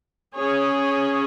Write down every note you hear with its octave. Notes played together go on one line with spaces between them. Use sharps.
C#4 G#4 C#5